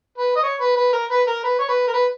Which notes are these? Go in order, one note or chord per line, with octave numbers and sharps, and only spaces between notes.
B4
D#5
C#5
B4
B4
A#4
B4
A#4
B4
C#5
B4
A#4
B4